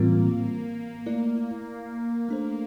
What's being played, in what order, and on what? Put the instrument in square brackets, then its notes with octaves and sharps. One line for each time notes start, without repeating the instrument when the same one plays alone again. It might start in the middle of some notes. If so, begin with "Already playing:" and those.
Already playing: [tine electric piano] A2 E3 G3 C4 F4 [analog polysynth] A#3
[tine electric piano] A3 E4 A#4 D5 [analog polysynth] A#3
[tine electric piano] A3 D4 A4 C5